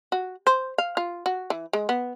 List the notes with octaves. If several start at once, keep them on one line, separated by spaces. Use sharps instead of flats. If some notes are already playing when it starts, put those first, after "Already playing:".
F#4
C5
F5
F4
F#4
E3
G#3
B3